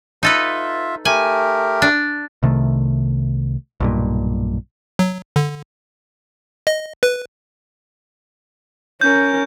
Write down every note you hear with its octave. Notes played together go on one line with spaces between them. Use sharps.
D#4 F4 A4 B4 E5
A3 G4 A#4 G#5
D4
C2 C3 D#3 A3
B1 G2 A#2
F#3
D3
D#5
B4
C#4 A#4 G6